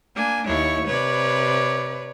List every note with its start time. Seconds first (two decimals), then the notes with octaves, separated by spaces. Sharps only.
0.16 A#3 D4 G#5
0.47 D#2 E4 C#5 C#6
0.87 C3 B4 C#5 D5